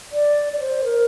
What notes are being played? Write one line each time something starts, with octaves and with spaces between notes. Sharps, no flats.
D5
D5
C5
A#4